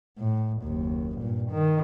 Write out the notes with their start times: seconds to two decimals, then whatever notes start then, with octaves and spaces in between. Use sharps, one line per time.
0.19 A2
0.62 F#1 D#2
1.17 G2 A#2
1.51 D#3